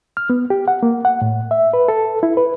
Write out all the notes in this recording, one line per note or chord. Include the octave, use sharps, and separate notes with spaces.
F6
B3
G4
F#5
A#3
F#5
A2
E5
B4
A4
E4
B4